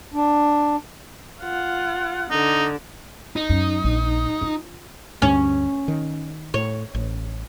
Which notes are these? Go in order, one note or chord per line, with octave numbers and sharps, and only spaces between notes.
D4
F4 F#5
D3 D#4
D#4
F#2
A#1
F4
D2 G2 C#4
D#3
A2 C#5
A1